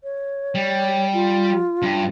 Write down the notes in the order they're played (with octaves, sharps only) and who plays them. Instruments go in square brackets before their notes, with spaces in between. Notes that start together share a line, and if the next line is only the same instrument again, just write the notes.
[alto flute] C#5
[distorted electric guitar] G3
[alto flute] F4
[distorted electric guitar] G2